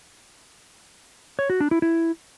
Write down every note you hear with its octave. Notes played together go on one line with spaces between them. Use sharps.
C#5
F#4
D4
E4
E4